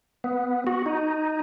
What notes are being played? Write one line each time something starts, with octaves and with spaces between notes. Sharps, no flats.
B3
F#4
D#4